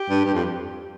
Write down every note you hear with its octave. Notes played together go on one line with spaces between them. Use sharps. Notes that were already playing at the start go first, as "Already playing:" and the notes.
Already playing: G4
G2
G2
F2